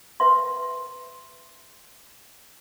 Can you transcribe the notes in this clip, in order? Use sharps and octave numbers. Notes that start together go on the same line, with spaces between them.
B4 E5 C6